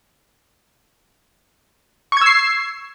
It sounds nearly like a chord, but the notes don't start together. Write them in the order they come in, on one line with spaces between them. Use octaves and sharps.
C#6 G#6 E6 C7